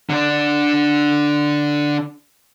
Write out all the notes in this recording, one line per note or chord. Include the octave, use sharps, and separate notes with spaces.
D3 D4